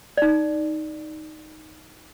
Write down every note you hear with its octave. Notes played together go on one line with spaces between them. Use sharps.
D#4 D5